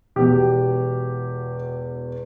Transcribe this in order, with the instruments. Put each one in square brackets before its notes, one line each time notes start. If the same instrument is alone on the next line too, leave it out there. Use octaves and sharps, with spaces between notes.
[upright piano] E1 E2 B2 G4